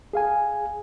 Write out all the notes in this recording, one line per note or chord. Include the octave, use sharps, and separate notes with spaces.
G#4 F5 G#5